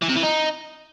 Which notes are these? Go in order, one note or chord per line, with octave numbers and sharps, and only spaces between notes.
E3
C3
E3
D#4